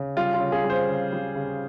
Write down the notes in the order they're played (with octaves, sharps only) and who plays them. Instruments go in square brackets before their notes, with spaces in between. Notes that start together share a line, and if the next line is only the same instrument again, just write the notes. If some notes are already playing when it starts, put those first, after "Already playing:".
Already playing: [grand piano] C#3
G3 F4
F4
C#3
G#4
G3
C5
C#3
G3
C#3